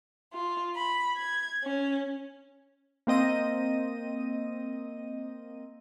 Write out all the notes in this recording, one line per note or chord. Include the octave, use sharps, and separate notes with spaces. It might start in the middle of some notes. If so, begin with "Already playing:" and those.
F4
B5
G#6
C#4
A#3 C4 D#5 D#7